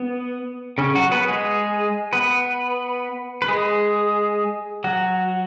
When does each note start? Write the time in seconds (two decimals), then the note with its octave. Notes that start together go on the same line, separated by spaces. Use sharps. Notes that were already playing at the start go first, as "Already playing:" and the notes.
Already playing: B3
0.78 C#3 C#4
0.95 F#3 F#4
1.11 B3 B4
1.28 G#3 G#4
2.13 B3 B4
3.42 B4
3.48 G#3 G#4
4.84 F#3 F#4